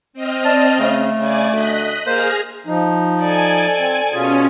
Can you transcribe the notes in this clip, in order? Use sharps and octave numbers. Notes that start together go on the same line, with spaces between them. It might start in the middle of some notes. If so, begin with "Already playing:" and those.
C4 D#5 F6
D5 A5
C#3 A3
C#3 D5 G#5
D2 D#5 F#6 B6
A#3 G#4 C5 F6 A#6
F3 D#4
A4 D5 G#5
C4
B2 C#4 F4 G#4